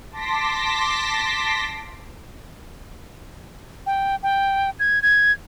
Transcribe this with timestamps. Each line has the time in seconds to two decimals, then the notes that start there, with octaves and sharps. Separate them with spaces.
0.11 A5 C6 D6 A#6 B6
3.86 G5
4.23 G5
4.79 G#6
5.02 G#6